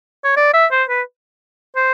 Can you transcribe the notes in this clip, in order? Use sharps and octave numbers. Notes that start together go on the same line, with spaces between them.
C#5
D5
E5
C5
B4
C5